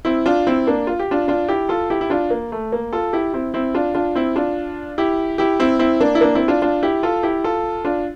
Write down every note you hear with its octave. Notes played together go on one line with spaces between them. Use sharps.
C4 E4
D4 F4
C4 E4
A#3 D4
F4
G4
D4 F4
D4 F4
E4 G4
F4 A4
E4 G4
E4
D4 F4
A#3
A3
A#3
F4 A4
E4 G4
C4 E4
C4 E4
D4 F4
D4 F4
C4 E4
D4 F4
E4 G4
E4 G4
C4 E4
C4 E4
A#3 D4
E4
A#3 D4
C4 E4
D4 F4
D4 F4
E4 G4
F4 A4
E4 G4
F4 A4
D4 F4